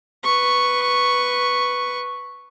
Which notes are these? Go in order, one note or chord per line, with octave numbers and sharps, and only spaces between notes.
B4 C#6